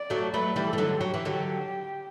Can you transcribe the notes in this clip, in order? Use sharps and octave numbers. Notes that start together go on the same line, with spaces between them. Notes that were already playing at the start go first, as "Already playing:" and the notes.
Already playing: D5
F#3 A3
F#3 A3 B4
E3 G3
A4
E3
D3 F#3
F#3 G4
E3
D3 F#3